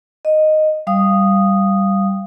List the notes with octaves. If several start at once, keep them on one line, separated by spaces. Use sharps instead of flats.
D#5
G3 F5 D#6